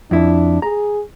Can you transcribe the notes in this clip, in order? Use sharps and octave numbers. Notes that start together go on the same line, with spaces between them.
F2 D4 E4
G#4 A#5